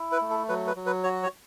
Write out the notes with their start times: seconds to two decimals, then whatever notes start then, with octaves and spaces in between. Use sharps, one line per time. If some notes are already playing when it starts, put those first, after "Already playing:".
Already playing: E4
0.12 B4
0.21 A3
0.30 A4
0.48 F#3 B4
0.67 B4
0.76 F#3
0.86 B4
1.04 F#4 C#5
1.23 C#5